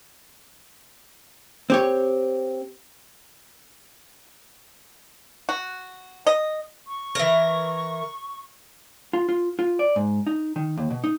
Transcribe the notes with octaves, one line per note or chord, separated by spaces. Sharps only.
C4 G4 C#5
F#4
D#5
C#6
E3 A#4
F4
F4
F4
D5
G#2
D#4
D#3
D#2
B2
D#4